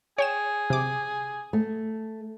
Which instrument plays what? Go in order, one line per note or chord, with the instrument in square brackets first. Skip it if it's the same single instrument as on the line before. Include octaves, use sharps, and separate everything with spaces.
[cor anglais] G#4 [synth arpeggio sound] C#5 G5 E7
[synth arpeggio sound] C3 D6
[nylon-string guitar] A3